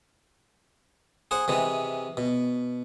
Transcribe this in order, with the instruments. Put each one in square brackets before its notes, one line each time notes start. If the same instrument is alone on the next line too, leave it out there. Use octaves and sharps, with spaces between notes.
[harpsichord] G#4 C5 F#5
C3 E3 G#3
B2